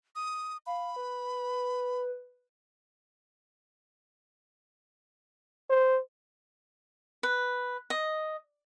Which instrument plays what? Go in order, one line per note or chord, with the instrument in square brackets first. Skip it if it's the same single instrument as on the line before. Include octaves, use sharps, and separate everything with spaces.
[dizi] D#6
[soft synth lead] F5 [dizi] B5
[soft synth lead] B4
[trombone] C5
[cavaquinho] B4
D#5